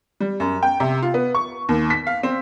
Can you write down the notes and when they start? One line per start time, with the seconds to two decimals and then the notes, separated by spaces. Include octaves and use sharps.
0.20 G3
0.40 F#2
0.63 G5
0.80 C3
1.02 F4
1.14 B3
1.35 C#6
1.69 D#2
1.90 B6
2.07 F5
2.23 C4